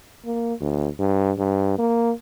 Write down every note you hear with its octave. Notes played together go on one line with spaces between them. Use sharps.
A#3
D2
G2
G2
A#3